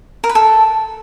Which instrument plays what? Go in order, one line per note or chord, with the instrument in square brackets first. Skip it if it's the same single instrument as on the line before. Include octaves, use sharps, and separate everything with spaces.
[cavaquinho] A#4
B4
A4